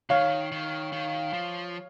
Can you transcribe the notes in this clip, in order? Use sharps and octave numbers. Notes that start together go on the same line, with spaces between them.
D#3 C#5 F5
D#3
D#3
F3